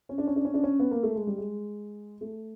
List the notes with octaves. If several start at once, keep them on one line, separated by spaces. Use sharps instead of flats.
C#4
D4
C#4
D4
C#4
D4
C#4
B3
A#3
A3
G#3
G3
G#3
A3